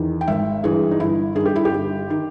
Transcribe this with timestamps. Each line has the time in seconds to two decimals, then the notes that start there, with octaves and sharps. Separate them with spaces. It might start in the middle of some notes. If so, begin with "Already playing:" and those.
Already playing: E2 D#3
0.21 G5
0.28 G#1 E5
0.64 G2 E3 G#4
0.91 D#4
1.00 G1 E4
1.35 G2 D#3 G#4
1.46 G4
1.56 E4
1.65 G4
1.72 G1
2.10 D#3